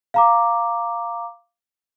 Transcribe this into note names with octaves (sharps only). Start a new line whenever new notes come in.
F5 A#5 D6